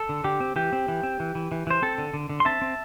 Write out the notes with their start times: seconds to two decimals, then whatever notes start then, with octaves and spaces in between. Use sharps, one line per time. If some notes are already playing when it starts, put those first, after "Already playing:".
Already playing: A4
0.09 D3
0.24 D3 G4
0.40 C4
0.56 E3 G4
0.73 C4
0.88 E3
1.03 C4
1.20 E3
1.35 E3
1.52 E3
1.67 E3 C5
1.82 C4 A4
1.98 D3
2.14 D3
2.30 D3
2.40 C6
2.45 C4 E5 A5
2.62 C4